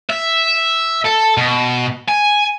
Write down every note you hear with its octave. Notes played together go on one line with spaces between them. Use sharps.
E5
A4
B2
G#5